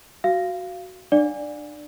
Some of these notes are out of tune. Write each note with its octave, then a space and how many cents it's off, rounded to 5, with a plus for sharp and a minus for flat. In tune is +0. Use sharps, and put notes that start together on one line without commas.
F#4 +0 F5 -15
D4 +25 D5 +0 F5 +30